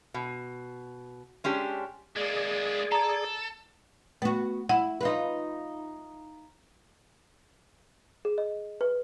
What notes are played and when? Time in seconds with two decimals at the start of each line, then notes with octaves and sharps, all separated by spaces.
0.14 B2
1.44 G#3 C#4 D4 G4
2.16 G#3 A#3 G#4 D5
2.92 A4 A#5
4.22 A3 B3 F#4
4.69 E4 F#5
5.01 D#4 F4 B4
8.25 G#4
8.38 D#5
8.81 B4